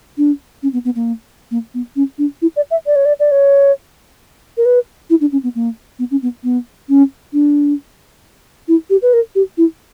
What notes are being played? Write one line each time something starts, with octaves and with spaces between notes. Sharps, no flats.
D4
C#4
B3
B3
A#3
A#3
B3
C#4
D4
E4
D5
E5
D5
C#5
D5
D5
C#5
A#4
B4
E4
D4
C#4
B3
A#3
B3
C#4
B3
B3
C#4
D4
E4
G4
B4
A#4
G4
E4